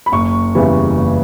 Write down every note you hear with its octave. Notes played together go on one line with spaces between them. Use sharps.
B5
F#1 C#6
E2 C#3 E3 G3
F#1